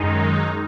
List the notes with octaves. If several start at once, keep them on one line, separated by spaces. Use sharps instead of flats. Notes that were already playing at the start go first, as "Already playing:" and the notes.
Already playing: F#2 D#3 G#3 D#4